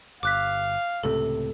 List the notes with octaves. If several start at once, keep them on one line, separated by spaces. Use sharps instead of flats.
G1 F5 D6 F#6 B6
C#2 A2 C3 A4